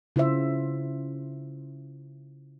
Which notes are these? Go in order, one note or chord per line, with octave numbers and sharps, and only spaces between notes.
C#3 E4 F4 C5 E5